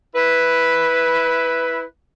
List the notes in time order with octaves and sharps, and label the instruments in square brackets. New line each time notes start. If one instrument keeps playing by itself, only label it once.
[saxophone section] E4 B4